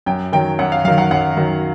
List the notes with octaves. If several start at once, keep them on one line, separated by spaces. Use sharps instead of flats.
F#2 G5
D#3 F#3 G5
F#2 F#5
F5
D#3 F#3 F5
F#5
F#2 F#5
D#3 F#3